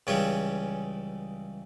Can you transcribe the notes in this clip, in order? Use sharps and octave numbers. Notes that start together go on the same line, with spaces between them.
C#2 C#3 E3 G3 C#4